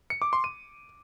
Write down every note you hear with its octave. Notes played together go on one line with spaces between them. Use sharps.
C#7
D6
C6
D#7